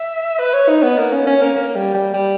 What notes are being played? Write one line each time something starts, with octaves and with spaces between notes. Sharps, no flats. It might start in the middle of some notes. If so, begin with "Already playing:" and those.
Already playing: E5
B4
C#5
D#4
B3
A#3
C#4
C#4
A#3
A#3
G3
G3
G3